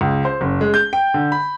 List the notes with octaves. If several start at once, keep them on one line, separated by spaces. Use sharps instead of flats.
C#2
C5
F#1
G#3
G6
G5
D3
B5